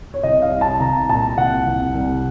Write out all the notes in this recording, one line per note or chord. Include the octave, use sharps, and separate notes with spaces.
C#5
C2 D#5
F5
C2
A5
C2 A#5
A#2 A5
C2 F#5
C2
C2